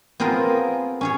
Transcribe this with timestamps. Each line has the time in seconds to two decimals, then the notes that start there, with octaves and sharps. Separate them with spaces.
0.20 B3 C4 F4 G#4 A#4
1.01 C#4 G#4 C#5